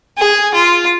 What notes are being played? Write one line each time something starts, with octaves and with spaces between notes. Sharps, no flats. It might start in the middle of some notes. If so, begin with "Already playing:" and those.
G#4
F4